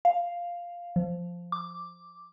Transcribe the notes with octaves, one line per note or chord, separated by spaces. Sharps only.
F5
F3
D6